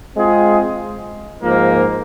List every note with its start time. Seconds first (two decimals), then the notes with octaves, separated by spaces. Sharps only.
0.16 G#3 C4 F4 G#4
1.42 G#2 F3 A#3